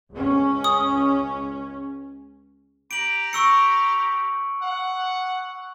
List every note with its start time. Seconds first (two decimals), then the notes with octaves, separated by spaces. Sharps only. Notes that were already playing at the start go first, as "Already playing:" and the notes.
0.12 C#2 C#4
0.64 D#6
2.91 G4 A#5 D7 F#7
3.33 C#6 E6 C#7
4.61 F#5